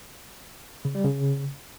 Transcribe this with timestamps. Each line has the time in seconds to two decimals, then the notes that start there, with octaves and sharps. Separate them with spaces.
0.85 C#3
0.95 G3
1.05 C#3